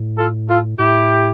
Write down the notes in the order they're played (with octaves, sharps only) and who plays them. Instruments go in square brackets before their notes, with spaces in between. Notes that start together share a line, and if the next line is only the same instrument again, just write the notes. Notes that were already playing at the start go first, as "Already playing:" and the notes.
Already playing: [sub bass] A2
[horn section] F4 A4
F4 A4
[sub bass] A2 [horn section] E4 G4